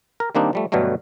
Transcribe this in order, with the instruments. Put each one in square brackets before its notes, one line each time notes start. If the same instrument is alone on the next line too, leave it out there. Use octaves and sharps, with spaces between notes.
[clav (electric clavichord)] A#4
D#3 G3 A#3 C4 D4 D#4
F3 G3 A3
G2 B2 D3 F#3 G3 A3